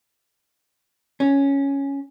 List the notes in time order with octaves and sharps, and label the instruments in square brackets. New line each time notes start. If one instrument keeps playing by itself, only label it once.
[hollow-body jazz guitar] C#4